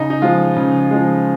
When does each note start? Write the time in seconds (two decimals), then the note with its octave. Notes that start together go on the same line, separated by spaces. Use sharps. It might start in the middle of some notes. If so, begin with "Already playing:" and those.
Already playing: C#3 D#4
0.10 D#4
0.22 F3 G#3 F4
0.56 C#3
0.91 F3 G#3